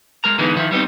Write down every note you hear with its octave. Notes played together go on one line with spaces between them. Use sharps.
G#3 A#4 A#5
D3 E3 G#3 B3 D#4
D#3 F3 E4
G3 B3 C4 D#4